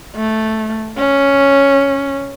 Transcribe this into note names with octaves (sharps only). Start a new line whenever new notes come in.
A3
C#4